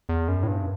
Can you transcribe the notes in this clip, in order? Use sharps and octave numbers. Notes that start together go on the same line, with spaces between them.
E2
F#2
A2
G2